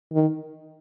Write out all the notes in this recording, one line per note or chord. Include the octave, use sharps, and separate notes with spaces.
D#3